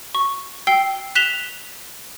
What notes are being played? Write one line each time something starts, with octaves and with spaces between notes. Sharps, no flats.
C#6
G5 E6 C7 G7
F#6 B6 E7 F7 G7